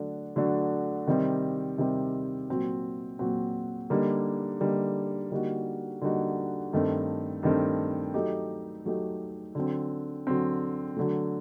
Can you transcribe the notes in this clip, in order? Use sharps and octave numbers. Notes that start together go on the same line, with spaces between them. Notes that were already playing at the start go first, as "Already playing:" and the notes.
Already playing: D3 F#3 A3 D4 F#4
D3 F#3 A3 D4 F#4
C3 D#3 G3 C4
C3 D#3 G3 C4
A#2 F#3 C4 F#4
A#2 F#3 C4 F#4
D3 G3 A#3 D#4
D3 G3 A#3 D#4
D3 G3 A#3 D#4 F#4
D3 G3 A#3 D#4 F#4
G2 D#3 A3 C4
G2 D#3 A3 C4
F#3 A3 D#4 G4
F#3 A3 D#4 G4
D3 F#3 C4
D3 F#3 C4
D3 F#3 A3